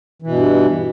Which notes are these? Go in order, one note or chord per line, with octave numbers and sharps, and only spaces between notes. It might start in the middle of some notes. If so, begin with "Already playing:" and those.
G2 B2 E3